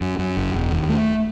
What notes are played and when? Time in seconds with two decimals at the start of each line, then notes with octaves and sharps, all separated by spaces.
0.01 F#2
0.19 F#2
0.37 F#1
0.54 E1
0.71 D#2
0.89 A3